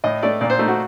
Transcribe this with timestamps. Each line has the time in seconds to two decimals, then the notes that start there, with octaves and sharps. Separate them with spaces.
0.04 A2 D#5
0.23 A3 D5
0.41 A#2 D5
0.50 C5
0.59 A3 D#4
0.68 F#4